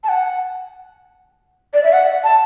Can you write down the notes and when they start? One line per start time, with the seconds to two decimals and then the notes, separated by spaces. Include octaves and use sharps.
0.04 A5
0.09 F#5
1.74 D5
1.84 E5
1.93 F#5
2.24 A5